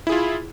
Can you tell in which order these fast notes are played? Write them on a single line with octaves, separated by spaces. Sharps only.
E4 G#4 F4